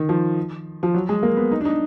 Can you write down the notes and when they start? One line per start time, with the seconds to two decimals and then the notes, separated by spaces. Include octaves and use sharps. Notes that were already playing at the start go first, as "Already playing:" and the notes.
Already playing: D#3
0.09 F3
0.83 F3
0.94 F#3
1.09 G#3
1.23 A#3
1.37 B3
1.52 D#4
1.61 D4
1.65 D#4